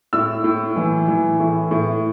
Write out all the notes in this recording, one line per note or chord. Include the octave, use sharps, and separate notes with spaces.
A2 E6
A2
E3
E3
A2
A2